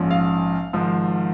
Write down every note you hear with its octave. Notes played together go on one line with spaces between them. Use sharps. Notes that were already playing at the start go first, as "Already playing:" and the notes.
Already playing: A#1 G#2 F3 C#4
F5
G#1 G#2 F3